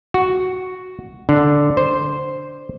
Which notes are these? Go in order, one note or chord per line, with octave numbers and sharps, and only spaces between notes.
F#4
D3
C5